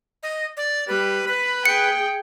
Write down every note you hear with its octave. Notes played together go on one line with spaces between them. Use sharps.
D#5
D5
G3 B4
B4 B5
G#4 G5 C#7